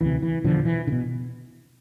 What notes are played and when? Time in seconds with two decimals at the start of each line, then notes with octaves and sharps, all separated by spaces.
0.01 D2 C3 E3
0.22 E3
0.44 E2 B2 D3 F3
0.65 E3
0.87 D3
0.92 B2